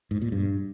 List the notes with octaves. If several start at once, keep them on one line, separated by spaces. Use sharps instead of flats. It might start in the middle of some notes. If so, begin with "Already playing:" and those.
G#2
A#2
G2